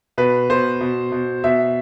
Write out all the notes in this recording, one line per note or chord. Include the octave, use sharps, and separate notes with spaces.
B2 B4
B2 C5
B2
B2
B2 E5